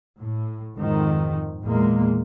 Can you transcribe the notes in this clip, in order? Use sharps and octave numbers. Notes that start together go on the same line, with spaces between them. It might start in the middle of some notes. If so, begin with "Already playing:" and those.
A2
F2 G#2 D#3
E2 A#2 G#3 A#3